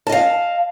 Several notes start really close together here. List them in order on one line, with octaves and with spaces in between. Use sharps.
A5 D#5 F5